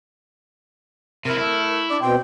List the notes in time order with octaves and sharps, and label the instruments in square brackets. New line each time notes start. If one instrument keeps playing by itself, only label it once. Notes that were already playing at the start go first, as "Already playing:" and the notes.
[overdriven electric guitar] C3 E4 [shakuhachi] A#4
[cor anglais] A3 [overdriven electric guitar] E4
[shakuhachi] D4 [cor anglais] D5
[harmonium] B2 G5 [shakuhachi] C4 [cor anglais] C5